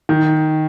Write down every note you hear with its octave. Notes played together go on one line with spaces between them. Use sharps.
D#3